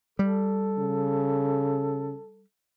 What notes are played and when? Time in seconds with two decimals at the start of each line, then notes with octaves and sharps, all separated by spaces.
0.19 G3 A4
0.78 C#3